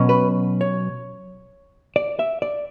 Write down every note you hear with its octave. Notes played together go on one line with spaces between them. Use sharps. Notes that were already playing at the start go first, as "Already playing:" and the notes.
Already playing: B2 F#3 C#4
B4
C#5
D5
E5
D5